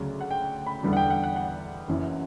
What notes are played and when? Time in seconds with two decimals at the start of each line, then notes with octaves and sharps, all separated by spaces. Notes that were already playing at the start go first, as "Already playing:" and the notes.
Already playing: D2 C#3 F#3
0.21 F#5
0.31 G5
0.66 B5
0.83 E2 D3 G3 B3
0.93 F#5
0.97 G5
1.10 F#5
1.24 F#5
1.36 F#5
1.88 F#1 F#2 E3